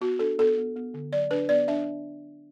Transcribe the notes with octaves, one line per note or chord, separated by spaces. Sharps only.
B3 F#4
D4 A4
B3 A4
B3
B3
D3
F#3 D5
D4 B4
B3 D5
D4 E5